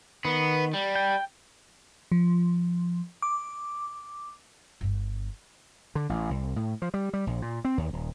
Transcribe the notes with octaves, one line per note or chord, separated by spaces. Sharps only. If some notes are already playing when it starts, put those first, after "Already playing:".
D#3 B3
G3
G5
F3
D6
G1 G2
D3
A1
C2
A2
F3
G3
G3
A#1
A#2
C4
D#2
D#1